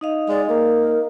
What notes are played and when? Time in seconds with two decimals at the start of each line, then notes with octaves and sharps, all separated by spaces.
0.01 D#4 D#5 F5
0.29 G#3 D5
0.49 A#3 A#4